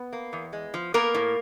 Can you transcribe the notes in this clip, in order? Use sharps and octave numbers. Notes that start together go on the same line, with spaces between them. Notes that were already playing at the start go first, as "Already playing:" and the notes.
Already playing: B3
A#3
E2
G#3
F3
A#3 B3 A#4
A2